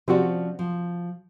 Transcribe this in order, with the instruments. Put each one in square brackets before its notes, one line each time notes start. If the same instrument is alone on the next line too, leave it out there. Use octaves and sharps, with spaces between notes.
[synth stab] C3 C4 F#4 [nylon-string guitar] F3 C#4 D5
[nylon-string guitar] F3